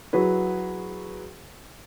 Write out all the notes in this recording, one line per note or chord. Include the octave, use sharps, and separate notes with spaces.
F#3 E4 F#4 G#4 B4